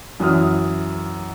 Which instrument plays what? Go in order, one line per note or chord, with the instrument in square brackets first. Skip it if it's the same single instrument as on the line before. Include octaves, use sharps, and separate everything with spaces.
[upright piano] F#2 E3 D#6 F6